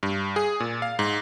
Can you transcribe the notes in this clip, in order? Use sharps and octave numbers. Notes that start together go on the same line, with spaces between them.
G2
G#4
A#2
F5
G#2